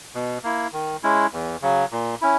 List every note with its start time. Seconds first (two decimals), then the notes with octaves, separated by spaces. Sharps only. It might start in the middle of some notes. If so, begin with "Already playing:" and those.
0.15 B2
0.44 A#3 E4
0.73 D#3
1.03 G#3 C#4 E4
1.33 E2
1.62 C#3 F#3
1.92 A#2
2.21 C#4 E4